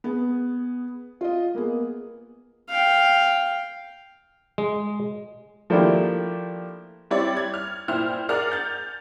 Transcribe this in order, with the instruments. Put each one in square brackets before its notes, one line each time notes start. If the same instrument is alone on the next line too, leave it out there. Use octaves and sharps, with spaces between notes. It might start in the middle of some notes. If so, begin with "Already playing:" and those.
[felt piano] B3 G#4
F4 D#5
A#3 B3 G#4
[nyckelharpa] F5 G5
[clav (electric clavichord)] G#3
[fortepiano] F3 A3 A#3 D4 E4 G4
[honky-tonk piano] G3 C4 E4 G4 C#5 D5
G#6
F6
A#2 E4 C5 G5 F6
G#4 A#4 D5 F#5 F6
G6 A6